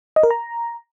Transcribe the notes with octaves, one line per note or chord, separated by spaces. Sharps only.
D#5
A#4
A#5